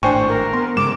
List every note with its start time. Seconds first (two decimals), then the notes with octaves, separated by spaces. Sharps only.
0.03 G#1 A2 D4 C5 G5 G#5 C#6
0.29 A#4
0.53 B3 C6
0.77 G2 C#3 G#3 D6 E7